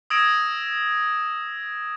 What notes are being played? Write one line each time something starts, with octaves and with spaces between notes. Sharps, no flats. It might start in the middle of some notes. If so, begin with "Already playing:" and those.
D#6 E6 G#6 A#6 D7 E7